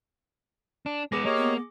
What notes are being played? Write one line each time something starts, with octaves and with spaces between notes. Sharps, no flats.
D4
G#3 B3 G#4 D6 A#6
A#3 G4 C#5 D#5
B3